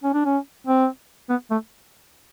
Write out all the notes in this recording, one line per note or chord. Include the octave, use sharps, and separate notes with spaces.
C#4
D4
C#4
C4
B3
A3